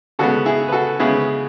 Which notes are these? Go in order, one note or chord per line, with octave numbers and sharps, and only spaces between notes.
C#3 G#3 B3 F#4 A4
E4 G#4
B4
F#4 A4
C#3 G#3 B3 E4 G#4